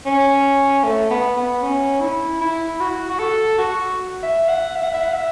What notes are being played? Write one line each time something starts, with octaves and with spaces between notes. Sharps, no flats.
C#4
A3
B3
B3
C#4
E4
E4
F#4
F#4
A4
F#4
E5
F#5
E5
F#5
E5
F#5
E5